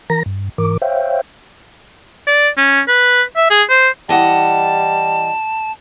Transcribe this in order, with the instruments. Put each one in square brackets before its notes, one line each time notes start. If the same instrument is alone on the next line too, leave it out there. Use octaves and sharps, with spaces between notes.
[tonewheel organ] E3 A#4 A#5 A#6
G2
G#2 E3 A#4 D6
C5 C#5 E5 F5 G5
[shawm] D5
C#4
B4
E5
G#4
C5
[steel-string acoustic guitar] E3 D#5 F#5 [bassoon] G3 [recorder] A5